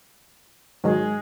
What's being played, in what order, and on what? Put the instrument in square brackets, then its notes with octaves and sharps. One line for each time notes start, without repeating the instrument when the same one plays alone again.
[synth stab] G#2 D#3 F#3 [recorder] G#3